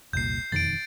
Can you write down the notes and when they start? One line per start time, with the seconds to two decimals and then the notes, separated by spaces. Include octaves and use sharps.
0.13 F1 C2 A#2 G6 C7
0.52 E1 F2 D#3 A6 D7